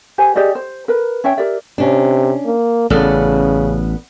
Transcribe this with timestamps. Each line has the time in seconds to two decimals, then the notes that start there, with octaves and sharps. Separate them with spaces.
0.18 G4 C5 G#5
0.35 G4 G#4 D5 D#5
0.55 C5
0.88 A#4 B4
1.24 C#4 C#5 E5 G5
1.37 G4 A#4 D5 E5
1.78 C3 C#4 D4
2.46 A#3
2.90 A1 C#3 B3 A4 D5